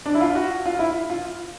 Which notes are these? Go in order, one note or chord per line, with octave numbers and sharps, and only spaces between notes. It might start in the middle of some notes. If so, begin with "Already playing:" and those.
D4
E4
F4
F#4
F4
E4
F4